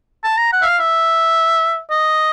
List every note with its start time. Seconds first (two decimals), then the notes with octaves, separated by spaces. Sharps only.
0.24 A5
0.37 A#5
0.53 F#5
0.62 E5
0.65 F5
0.79 E5
1.90 D#5